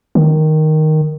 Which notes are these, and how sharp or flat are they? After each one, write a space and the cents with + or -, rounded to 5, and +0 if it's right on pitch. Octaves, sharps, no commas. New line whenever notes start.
D#3 +0